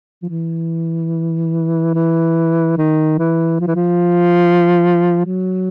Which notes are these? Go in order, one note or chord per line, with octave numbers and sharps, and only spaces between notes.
F3
E3
E3
D#3
E3
F3
E3
F3
F#3